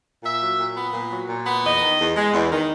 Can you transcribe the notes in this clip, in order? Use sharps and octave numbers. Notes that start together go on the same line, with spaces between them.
A#2 E5
F#3
A#2
B3
A#2
F#3
A#2
B3
E2 D#5
D#3
E2
G#3
E2
D#3